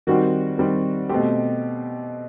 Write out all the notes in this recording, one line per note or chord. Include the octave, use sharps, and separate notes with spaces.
D#3 G3 C4 F#4
D#3 G3 C4
B2 A3 C4 G4